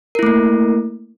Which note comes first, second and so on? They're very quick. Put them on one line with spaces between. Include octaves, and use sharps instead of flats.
A#4 E4 A3 A#3